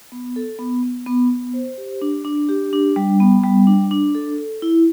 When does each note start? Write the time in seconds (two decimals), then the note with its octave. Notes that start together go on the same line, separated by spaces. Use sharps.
0.12 B3
0.36 A4
0.59 B3
0.83 B3
1.06 B3
1.30 B3
1.54 C5
1.78 G4
2.02 D4
2.25 D4
2.49 G4
2.73 D4
2.96 G3
3.20 B3
3.43 G3
3.67 D4
3.91 D4
4.15 A4
4.38 A4
4.62 E4